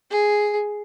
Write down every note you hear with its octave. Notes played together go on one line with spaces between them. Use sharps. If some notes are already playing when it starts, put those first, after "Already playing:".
G#4